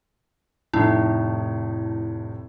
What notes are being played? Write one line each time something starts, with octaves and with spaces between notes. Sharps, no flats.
F1 A2 D#4 E4